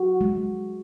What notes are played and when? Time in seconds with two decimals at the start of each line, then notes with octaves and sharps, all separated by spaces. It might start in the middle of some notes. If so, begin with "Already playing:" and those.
Already playing: F#4
0.21 G#3